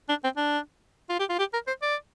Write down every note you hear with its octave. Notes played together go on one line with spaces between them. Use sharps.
D4
C4
D4
F4
G4
F4
G4
A#4
C5
D5